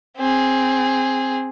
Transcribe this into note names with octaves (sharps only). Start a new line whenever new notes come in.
C4 G#4